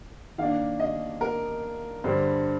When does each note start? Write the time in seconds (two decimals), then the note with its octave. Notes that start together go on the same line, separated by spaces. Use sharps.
0.38 D#3 A#3 D4 F5
0.80 D#5
1.21 A#4
2.04 G2 D3 G3 C5